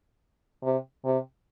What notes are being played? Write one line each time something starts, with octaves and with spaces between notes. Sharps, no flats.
C3
C3